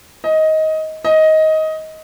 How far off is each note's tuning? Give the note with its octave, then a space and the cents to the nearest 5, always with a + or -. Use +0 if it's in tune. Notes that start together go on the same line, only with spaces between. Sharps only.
D#5 +15
D#5 +15